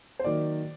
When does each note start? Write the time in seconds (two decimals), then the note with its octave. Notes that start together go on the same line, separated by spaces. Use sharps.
0.19 C5
0.24 D#3 F#3 A#3 D5